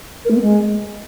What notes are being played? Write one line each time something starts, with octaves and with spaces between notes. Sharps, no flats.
A#4
A3
B3
G#3